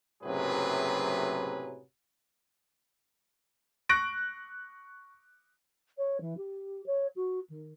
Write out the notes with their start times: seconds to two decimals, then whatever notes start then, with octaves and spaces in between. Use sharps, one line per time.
0.24 F#1 A2 C3 F#3 G#4 B4
3.89 C#6 F#6 A#6 D7
5.97 C#5
6.20 E3
6.37 G4
6.86 C#5
7.15 F#4
7.49 D#3